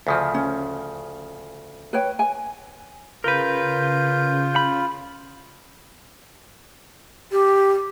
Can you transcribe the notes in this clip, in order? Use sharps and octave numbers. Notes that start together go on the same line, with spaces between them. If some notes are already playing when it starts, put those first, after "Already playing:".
D2 C#3 F3
C#4
B4 C#5 G5
G#5
C#3 F4 A#4 B4 G6
B5
G4